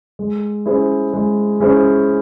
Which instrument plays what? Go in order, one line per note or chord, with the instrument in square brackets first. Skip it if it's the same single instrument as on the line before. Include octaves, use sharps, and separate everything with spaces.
[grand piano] G#3
C#4 E4 G#4 C5
G#3
C#4 E4 G#4 C5